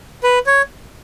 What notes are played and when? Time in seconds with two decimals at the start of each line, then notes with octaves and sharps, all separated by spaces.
0.23 B4
0.46 C#5